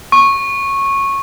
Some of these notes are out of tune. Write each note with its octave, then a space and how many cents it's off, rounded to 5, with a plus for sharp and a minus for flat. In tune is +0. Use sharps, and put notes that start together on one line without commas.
C#6 -15